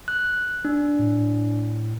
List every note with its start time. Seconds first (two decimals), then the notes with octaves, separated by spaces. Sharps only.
0.08 F#6
0.65 D4
0.99 A2